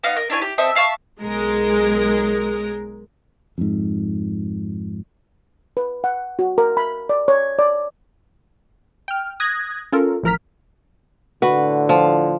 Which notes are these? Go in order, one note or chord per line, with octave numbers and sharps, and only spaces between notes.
B3 D#4 F5 F#5
A#4 D#5
D4 E4 C#5 G#5
G4
C4 A4 D#5 E5
E5 F5 A5 C#6
B1 G#3 A#4
F2 G#2
B4
F#5
F#4
A#4
B5
D5
C#5
D5
G5 F6
D#6 F#6 G#6 A#6
C#4 F4 A4 A#4
A1 F3 A#4 A#5 F6 B6
A2 D3 F#4 B4
F3